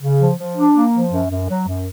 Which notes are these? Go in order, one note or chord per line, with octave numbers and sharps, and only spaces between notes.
C#3
F3
F3
D4
A#3
F3
F#2
F#2
F#3
F#2